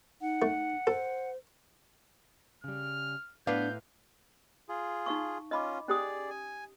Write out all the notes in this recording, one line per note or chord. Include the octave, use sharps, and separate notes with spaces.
D#4 F#5
A3
A4 C5
C#3 G3 F6
A2 B3 D4 B4 F5 G6
F4 G#4
D#4 F5 C#6
C#4 F4 D#5 B5 D6
C#4 G4 G#4 D5 D#6
G#5